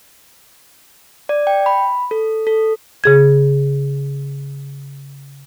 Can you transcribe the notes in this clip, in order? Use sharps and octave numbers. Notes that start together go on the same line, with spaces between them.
D5
G5
B5
A4
A4
C#3 G#4 G#6